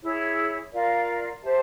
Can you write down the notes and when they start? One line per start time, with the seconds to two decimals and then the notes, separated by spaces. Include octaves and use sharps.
0.02 E4 G#4 C#5
0.72 F4 A#4 D5 F5
1.42 G4 C5 E5 A5